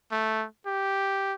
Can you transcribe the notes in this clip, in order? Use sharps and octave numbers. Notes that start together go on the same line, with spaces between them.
A3
G4